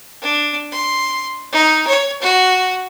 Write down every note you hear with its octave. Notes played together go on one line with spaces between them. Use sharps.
D4
C6
D#4
C#5
F#4